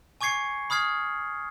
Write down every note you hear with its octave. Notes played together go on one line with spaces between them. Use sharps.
G#5 C#6 D6 G#6 C7 C#7
B5 D#6 F6 G#6 C7